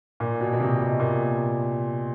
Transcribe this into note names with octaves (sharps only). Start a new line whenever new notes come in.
A#2
B2
B2
C3
B2
A#2